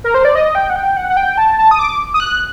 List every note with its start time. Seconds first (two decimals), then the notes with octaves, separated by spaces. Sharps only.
0.04 A#4
0.14 C5
0.25 D5
0.35 D#5
0.55 G5
0.70 F#5
0.76 G5
0.97 F#5
1.10 F#5
1.17 G5
1.38 A5
1.59 A5
1.71 D#6
1.79 D6
2.14 D#6
2.20 F#6